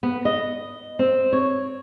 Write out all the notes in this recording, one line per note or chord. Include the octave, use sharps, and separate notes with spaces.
B3
D#5
C4
C#5